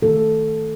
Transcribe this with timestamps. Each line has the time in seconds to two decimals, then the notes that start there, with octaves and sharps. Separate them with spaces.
0.02 D#3 A3 A4